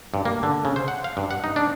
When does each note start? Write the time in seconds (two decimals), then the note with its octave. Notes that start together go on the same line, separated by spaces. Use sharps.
0.14 G2
0.25 A#3
0.43 D3
0.65 C#3
0.76 C5
0.88 F#5
1.04 F5
1.17 G2
1.31 F#5
1.44 D#4
1.56 D4